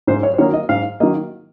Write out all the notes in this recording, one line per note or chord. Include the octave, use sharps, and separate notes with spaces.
G#2 C5
C#5
C5
D#3 F#3 A#3 C#5
D#5
G#2 F5
D#3 F#3 A#3 D#5